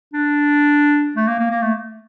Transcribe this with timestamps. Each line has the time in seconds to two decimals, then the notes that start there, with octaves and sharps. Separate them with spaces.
0.14 D4
1.16 A3
1.28 A#3
1.39 A#3
1.51 A#3
1.62 A3